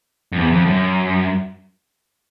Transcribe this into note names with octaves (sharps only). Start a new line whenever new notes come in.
F2
E2
F2
F#2